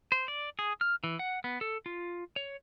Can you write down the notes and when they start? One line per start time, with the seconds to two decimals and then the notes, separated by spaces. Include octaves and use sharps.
0.12 C5
0.28 D5
0.59 G#4
0.81 F6
1.04 E3
1.19 F#5
1.44 B3
1.61 A4
1.86 F4
2.36 C#5